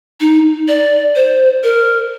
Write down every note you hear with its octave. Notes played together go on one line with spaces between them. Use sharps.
D#4
D5
C5
A#4